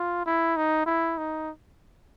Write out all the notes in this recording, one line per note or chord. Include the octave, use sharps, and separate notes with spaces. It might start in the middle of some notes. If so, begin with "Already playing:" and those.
Already playing: F4
E4
D#4
E4
D#4